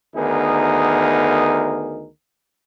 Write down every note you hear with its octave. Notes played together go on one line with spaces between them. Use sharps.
D2 D#3 B3 D#4 G#4 A#4